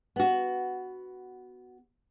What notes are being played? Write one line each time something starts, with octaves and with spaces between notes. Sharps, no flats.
B3 F#4